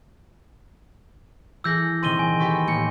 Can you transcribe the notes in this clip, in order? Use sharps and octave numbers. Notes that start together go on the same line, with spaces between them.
E3 G#4 A4 E6 G6 A#6
A#1 C3 D#3 C6 D#7 G7
G#5
G4 A4 B4 C#6
A1 A#3 C#7